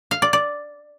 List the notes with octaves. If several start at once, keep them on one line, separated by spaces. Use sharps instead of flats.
F5
D5
D5